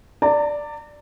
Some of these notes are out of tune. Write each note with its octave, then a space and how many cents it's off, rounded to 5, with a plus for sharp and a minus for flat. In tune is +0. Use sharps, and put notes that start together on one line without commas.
D5 +0 A#5 -40